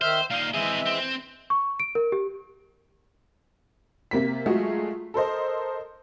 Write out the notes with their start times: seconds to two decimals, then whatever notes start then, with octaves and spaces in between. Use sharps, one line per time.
0.01 D#3 C5 E5 F6
0.30 A#2 D#4 F5
0.54 E3 G#3 C4 G#4 E5
0.86 C4
1.50 C#6
1.80 D7
1.95 A#4
2.12 G4
4.11 C3 A#3 B6
4.46 F#3 G#3 A3 F4 F#4 G#4
5.14 A4 A#4 C5 D#5